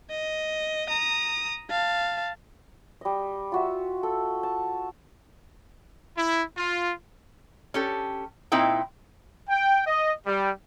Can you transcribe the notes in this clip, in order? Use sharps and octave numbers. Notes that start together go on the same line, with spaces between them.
D#5
A#5 D#6
F5 A5
G3 D#5
F4 F#4 E5
A4
A5
E4
F4
C#4 G4 A4
A#2 C4 D#4 E4 G5
G5
D#5
G3